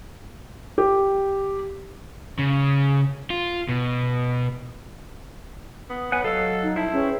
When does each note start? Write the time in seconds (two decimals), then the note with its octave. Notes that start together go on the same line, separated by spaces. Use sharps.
0.78 G4
2.39 C#3
3.30 F4
3.69 B2
5.90 B3 D#6
6.12 B3 C#5 F#5 G#5
6.24 F#3 A4 D#5 F5 E6
6.63 D#4
6.76 G3 E4 C5 E5 A5
6.93 C#4 G#4 B4 G5